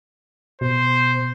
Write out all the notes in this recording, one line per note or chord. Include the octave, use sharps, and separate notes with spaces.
B2 C5